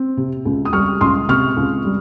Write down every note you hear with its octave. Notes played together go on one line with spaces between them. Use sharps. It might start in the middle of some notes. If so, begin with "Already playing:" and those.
Already playing: C4
C3
C#2
D#6
G3 C#6 F6
C#2 C6 D#6
C3 C#6 F6
C#2
G3